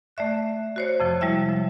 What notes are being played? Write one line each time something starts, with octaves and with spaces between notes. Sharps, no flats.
A3 D5 E5 F#6
F#4 C5 C#5
F2 C3 F3
G3 G#3 E4 C#5 E5
F3